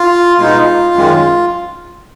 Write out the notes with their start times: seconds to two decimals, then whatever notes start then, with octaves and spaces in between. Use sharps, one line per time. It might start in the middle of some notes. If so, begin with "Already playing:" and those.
Already playing: F4
0.38 B2 G#3 D#4 F4
0.94 F#2 D#3 G#3